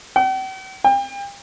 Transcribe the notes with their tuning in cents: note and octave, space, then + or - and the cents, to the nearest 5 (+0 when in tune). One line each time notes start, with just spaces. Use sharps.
G5 -45
G5 +35